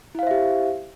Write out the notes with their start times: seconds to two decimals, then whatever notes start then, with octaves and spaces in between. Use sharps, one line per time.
0.15 E4
0.19 F5
0.23 C5
0.27 E5
0.31 G4